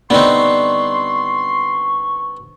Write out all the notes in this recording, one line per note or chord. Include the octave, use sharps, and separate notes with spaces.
D3 G3 B3 C4 D#4 C6 C#6